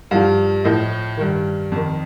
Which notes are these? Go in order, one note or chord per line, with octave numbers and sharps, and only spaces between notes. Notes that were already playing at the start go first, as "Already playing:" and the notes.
G2 F3 F5
A2 F3 D#5
G2 D#3
F2 D#3